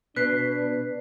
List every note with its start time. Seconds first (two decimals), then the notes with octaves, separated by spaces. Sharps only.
0.16 B2 D4 B4 F#6 B6 C7